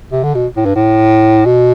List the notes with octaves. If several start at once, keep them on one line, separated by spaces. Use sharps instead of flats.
C3
D3
B2
A2
G2
A2
B2